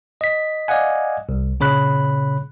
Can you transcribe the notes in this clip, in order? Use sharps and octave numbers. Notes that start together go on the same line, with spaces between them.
D#5 B6
D5 D#5 F5 F#5 G#5
C2
A#2 C#3 C#5 B5 F#6